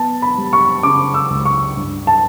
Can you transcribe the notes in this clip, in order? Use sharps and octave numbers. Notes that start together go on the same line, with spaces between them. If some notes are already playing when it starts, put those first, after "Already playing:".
Already playing: B3 A5
B5
G3
C#6
C#3 D6
E6
C#2
C#6
G2
A5